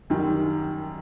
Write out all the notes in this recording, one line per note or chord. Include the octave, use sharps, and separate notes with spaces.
F#2 D#3 G3